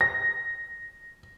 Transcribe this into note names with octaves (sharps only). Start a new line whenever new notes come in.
A#6